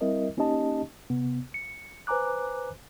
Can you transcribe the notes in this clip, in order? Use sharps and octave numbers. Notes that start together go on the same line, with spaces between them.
G3 C4 E4 A#4 D#5 E5
A#3 C#4 D#4 G4 D#5 A5
C3 B3
C#7
B4 C5 G#5 A#5 D6 F#6